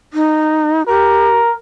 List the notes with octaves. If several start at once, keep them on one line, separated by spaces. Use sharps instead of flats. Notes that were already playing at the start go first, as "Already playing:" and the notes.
D#4
G4 A#4